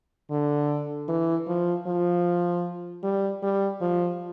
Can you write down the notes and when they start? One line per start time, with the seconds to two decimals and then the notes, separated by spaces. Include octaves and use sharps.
0.31 D3
1.08 E3
1.48 F3
1.87 F3
3.03 G3
3.43 G3
3.81 F3